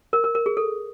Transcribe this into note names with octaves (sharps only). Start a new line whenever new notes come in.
A#4
A#4
A#4
G#4
A4